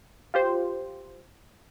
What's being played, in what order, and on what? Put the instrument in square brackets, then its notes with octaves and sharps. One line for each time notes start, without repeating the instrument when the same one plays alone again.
[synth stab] F4 G4 C5